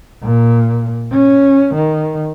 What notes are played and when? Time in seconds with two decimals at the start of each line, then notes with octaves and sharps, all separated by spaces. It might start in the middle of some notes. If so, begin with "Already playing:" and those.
0.23 A#2
1.12 C#4
1.75 D#3